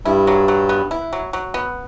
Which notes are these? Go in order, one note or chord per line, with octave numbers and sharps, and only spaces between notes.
G2 G3 E4
F#3
F#3
B3
E4
F#3
F#3
B3